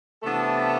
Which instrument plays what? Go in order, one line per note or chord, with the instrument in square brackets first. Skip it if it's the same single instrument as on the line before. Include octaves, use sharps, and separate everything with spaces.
[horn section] C3 E3 A3 B3 D4 A4